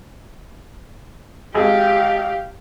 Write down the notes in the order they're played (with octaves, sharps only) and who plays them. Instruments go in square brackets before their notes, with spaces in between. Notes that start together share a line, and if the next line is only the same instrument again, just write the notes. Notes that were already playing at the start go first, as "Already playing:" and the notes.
[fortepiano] G#1 G#3 G#4 [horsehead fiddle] G4 F5